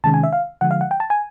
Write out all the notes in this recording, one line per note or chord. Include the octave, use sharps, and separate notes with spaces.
C3 D#3 G#3 C#4 A5
G#5
E5
F5
D3 F3 G#3 F#5
F5
F#5
G5
A5
G#5